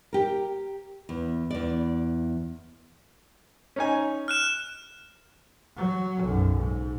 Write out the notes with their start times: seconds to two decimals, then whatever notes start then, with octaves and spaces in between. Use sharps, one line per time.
0.13 G4 A#4
1.09 E2
1.51 E2 D5
3.76 C#4 D#4 G#5
4.28 F6 F#6 E7
5.77 F#3
6.24 B1 F#2
6.57 G#2